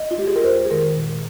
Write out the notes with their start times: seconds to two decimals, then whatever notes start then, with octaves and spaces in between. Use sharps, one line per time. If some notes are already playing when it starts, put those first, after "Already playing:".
Already playing: D#5
0.11 F4
0.18 G#3 G4
0.27 G#4
0.36 A#4
0.44 F2 C5
0.65 G#4
0.71 D#3 G#3 A#4
0.96 A#2